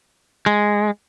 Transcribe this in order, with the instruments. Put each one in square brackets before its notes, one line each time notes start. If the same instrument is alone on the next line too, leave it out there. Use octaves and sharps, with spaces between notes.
[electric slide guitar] G#3